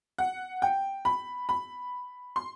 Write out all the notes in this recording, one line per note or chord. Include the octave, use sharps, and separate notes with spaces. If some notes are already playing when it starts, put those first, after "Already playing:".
F#5
G5
B5
B5
C6